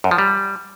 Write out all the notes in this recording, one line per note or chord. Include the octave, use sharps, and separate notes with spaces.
F#2
F3
G3